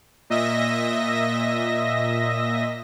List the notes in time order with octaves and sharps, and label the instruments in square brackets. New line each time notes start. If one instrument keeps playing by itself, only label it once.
[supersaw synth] A#2 D#5 E5 A#6